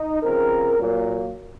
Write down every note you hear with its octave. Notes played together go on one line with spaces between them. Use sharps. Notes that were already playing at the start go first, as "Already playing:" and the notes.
Already playing: D#4
C#3 F3 C4 A#4
A#2 F#3 A#3